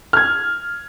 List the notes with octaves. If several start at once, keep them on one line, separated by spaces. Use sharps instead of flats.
F6 G#6